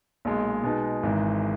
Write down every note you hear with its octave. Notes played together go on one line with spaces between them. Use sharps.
B1 A#2 G#3
B2 G#3 B3 D#4
G#1 G#2 E3